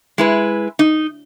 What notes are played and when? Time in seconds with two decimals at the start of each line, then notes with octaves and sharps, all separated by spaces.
0.18 G#3 E4 B4
0.79 D#4